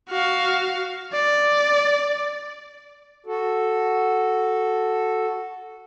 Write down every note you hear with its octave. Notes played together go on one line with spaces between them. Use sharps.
F#4 F5
D5
F#4 A4